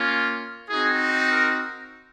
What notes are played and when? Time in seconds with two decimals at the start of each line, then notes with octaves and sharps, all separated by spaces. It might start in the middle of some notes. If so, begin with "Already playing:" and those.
Already playing: A#3 C#4 F4
0.69 C4 D#4 F#4 G#4
1.30 A#4